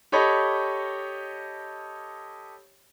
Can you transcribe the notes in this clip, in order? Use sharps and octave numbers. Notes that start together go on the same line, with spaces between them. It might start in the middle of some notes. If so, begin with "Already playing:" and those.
G4 A4 C#5 D#5 B5